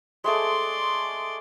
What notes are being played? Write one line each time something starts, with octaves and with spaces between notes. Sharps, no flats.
G#3 A3 G#4 D5 C6